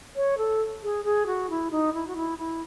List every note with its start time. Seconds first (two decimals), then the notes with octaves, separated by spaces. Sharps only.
0.16 C#5
0.38 A4
0.83 G#4
1.04 G#4
1.26 F#4
1.50 E4
1.71 D#4
1.93 E4
2.07 F#4
2.16 E4
2.38 E4